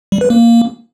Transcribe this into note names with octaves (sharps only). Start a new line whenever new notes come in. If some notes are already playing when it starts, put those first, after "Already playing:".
G3
B4
A#3